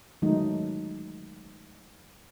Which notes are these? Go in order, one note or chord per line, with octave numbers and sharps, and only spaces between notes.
D#3 F#3 G#3 A3 D#4